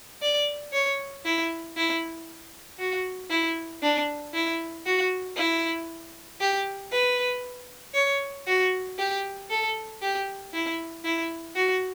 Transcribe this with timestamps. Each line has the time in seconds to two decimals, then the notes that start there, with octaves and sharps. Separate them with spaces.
0.22 D5
0.73 C#5
1.25 E4
1.77 E4
2.79 F#4
3.30 E4
3.82 D4
4.34 E4
4.86 F#4
5.37 E4
6.41 G4
6.92 B4
7.94 C#5
8.47 F#4
8.98 G4
9.50 A4
10.02 G4
10.54 E4
11.04 E4
11.56 F#4